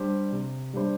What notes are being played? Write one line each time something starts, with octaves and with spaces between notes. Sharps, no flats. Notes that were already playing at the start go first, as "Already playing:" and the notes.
Already playing: G3 D4 G4 C5
C3
G3 D4 G4 C5